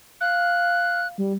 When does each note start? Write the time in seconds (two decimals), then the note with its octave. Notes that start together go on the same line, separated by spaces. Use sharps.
0.21 F5 F#6
1.18 G3